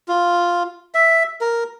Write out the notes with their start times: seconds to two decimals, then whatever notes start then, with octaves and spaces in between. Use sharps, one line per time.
0.08 F4
0.94 E5
1.41 A#4